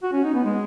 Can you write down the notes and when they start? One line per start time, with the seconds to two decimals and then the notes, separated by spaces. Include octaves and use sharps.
0.03 F#4
0.13 C#4
0.24 D#4
0.34 B3
0.45 G#3